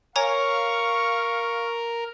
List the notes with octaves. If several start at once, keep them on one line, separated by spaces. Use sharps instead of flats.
A#4 C#5 F5 G#5 A#5 C#6